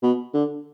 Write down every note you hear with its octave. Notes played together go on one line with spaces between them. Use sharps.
B2
D3